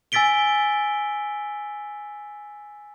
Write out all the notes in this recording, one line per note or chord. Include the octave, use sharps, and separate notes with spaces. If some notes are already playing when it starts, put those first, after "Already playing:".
G#5 E6 A6 B6 D7 G7